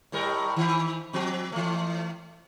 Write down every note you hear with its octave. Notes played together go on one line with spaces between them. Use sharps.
A2 G3 A#4
D#3
F3 C4
E3 A3